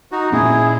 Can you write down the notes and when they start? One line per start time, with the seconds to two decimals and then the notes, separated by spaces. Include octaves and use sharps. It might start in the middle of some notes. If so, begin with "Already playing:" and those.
0.12 D#4 F#4
0.32 A#2 A#3 C#4 E4 G#4